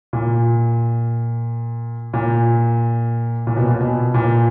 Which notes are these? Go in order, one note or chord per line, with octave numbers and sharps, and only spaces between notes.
A#2
A#2
A#2
B2
A#2
B2
A#2